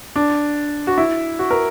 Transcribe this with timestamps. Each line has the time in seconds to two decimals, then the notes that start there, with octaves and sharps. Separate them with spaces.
0.16 D4
0.87 F#4
0.98 E4
1.39 F#4
1.51 A#4